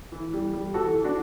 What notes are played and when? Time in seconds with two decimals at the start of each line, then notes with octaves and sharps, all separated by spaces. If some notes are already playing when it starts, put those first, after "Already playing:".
0.12 E3
0.33 G3
0.53 G3
0.74 E3 F#4 A4
0.94 E3
1.04 D4 F#4